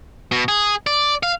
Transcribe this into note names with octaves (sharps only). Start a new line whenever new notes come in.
B2
G#4
D5
F5